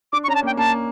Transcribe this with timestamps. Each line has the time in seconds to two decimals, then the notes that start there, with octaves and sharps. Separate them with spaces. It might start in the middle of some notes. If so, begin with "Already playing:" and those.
0.13 D4 D6
0.24 C#6
0.28 C#4 A#5
0.35 A5
0.43 A#3 G5
0.57 A#3 A5